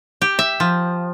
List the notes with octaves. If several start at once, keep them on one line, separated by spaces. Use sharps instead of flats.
G4
E5
F3